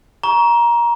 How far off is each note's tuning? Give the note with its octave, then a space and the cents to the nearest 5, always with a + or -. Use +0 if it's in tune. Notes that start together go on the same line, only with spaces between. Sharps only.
A#5 +20 C#6 +30